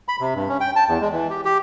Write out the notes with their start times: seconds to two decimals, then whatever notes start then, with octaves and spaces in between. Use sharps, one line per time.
0.08 B5
0.20 C3
0.34 G2
0.48 C#4
0.60 G5
0.76 A5
0.89 E2
1.01 G#3
1.13 E3
1.30 G4
1.45 G4